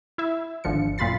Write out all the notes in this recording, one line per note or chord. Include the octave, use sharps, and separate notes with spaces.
E4 E5
G#1 D3 F3 C#7
F#2 A#2 F4 B5 A6 C7